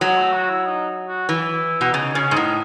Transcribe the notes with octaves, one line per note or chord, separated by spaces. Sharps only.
F#3 G#3
A3
F#4
E4
D#4
F#4
E3 E4
B2
C#3 D#4
C#3 C#4
G#2
A2 D#4